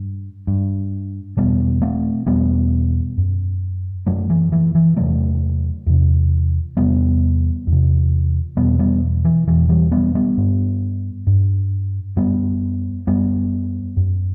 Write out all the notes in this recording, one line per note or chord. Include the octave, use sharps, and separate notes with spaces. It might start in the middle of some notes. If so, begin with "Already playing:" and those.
Already playing: G2
G2
E2 B2 G3 B3
A3 C4
E2 B2 G3 B3
F#2
F#2 F#3 A3
E3
E3
E3
E2 C3 F#3 A3
E2 C3
E2 C3 G3 B3
E2
C3
E2 B2 G3 B3
G3 B3
E3
E2 B2 E3
E3 G3
G3 B3
G3 B3
G2
G2
F#2 G3 B3
F#2 G3 B3
F#2